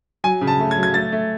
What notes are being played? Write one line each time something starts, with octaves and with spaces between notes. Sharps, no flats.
F#3 G#5
C#3
A5
A3
G#6
F#3
G#6
A3 A6
A3